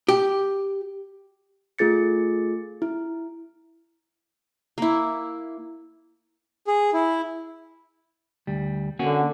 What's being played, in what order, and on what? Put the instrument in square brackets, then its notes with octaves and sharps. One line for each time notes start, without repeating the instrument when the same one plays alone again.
[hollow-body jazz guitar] G4
[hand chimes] A3 F4 G#4 A6 C#7
E4
[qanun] A#3 E4
[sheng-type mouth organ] G#4
E4
[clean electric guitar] D2 G3
[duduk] D3 [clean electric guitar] A#3 C#4 F#4